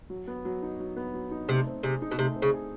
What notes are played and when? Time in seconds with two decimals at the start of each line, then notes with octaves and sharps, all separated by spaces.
0.10 F#3
0.27 B3
0.45 F#3
0.62 D#4
0.80 F#3
0.97 B3
1.14 F#3
1.31 D#4
1.49 C3 A3
1.67 C4
1.83 C3 G#4
2.02 D#4
2.11 B2
2.19 C3 A3
2.36 C4
2.42 C#3
2.54 G#4